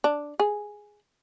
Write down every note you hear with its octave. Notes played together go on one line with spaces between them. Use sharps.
D4
G#4